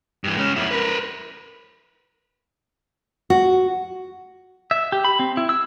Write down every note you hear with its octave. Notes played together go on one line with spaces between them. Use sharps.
G2 E3
G#3 C#4
F2 E4
A#4 B4
F#4
E5
G4
B5
C4
E4
E6